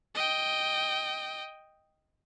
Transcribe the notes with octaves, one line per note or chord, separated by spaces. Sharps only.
D#5 G5